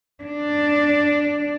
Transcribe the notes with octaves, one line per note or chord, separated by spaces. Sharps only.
D4